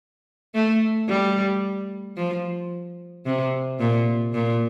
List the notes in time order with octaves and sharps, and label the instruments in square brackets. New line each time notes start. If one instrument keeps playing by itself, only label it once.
[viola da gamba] A3
G3
F3
C3
A#2
A#2